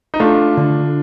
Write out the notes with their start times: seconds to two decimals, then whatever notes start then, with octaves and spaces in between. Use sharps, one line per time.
0.14 D#4
0.20 A3 D4 F4
0.57 D3